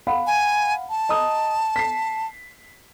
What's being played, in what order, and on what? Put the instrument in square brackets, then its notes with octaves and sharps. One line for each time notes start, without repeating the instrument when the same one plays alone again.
[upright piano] F5 F#5 B5
[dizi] G#5
A5
[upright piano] D#5 A#5 D#6
B6 C7